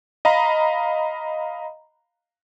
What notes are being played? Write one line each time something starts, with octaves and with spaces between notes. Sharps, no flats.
D#5 F5 A#5 B5